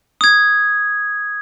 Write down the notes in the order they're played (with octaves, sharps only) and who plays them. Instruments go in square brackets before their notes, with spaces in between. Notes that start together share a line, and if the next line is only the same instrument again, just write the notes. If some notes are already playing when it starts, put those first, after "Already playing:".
[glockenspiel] D#6 G#6